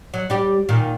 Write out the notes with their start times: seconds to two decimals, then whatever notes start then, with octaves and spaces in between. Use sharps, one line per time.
0.14 F#3
0.30 G3 G4
0.69 A#2 D#3